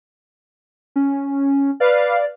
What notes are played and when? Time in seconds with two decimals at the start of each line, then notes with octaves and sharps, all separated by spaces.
0.96 C#4
1.80 B4 D5 F5